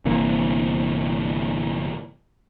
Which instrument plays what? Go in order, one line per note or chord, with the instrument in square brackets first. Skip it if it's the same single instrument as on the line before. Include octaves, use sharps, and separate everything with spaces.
[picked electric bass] G1 C3 E3 A#3